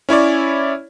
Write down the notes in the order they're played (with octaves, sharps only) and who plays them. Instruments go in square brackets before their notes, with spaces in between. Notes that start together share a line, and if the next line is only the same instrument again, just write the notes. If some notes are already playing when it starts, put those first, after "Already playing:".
[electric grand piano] C#4 E4 C#5 D5